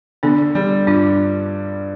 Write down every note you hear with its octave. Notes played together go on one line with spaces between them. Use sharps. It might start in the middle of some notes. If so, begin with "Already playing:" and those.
D3 B3 D4
G3
G2 D4 F4